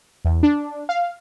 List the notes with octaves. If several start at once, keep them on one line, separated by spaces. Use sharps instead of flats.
E2
D4
F5